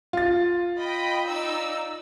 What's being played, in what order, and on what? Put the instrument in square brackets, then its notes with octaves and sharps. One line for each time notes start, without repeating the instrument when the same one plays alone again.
[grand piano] F4 A6
[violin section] D#5 G5 B5
D#4 D5 E6